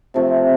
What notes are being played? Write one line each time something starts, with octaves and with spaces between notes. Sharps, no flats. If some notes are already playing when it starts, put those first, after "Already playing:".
C3 F3 A3 C4